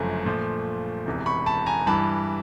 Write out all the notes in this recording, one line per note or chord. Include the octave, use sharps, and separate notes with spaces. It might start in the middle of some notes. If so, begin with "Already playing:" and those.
Already playing: G1 F#2 C#3 F3 A3
A#2 F3 A3
E1 E2 C3
B5 C#6
A5 B5
G#5 A#5
G2 E3 G3 A5 B5